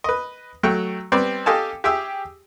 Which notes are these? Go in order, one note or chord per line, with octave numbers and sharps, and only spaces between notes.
B4 D#5
F#3 A3 G5 C#6
G3 B3 C4 D5
G4 A4 D#5 F5 G#5 A5
G4 G#4 E5 G5 D#6 E6